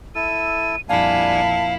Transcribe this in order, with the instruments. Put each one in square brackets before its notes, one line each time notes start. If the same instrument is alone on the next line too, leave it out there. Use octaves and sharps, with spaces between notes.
[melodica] E4 A4 E6 [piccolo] D#7
[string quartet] F2 A#2 E4 [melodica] G3 D4 G#5 [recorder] F5 [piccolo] A5